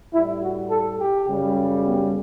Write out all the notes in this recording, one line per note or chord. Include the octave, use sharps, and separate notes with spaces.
A2 G3 E4
F#4
A4
G4
F#2 C#3 G3
B3